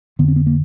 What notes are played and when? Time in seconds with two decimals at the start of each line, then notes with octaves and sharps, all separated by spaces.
0.19 F2 D3 B3
0.28 C4
0.36 B3
0.46 A#3